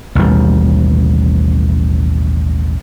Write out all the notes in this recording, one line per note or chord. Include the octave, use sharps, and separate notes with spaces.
A1 D#2 B2 G3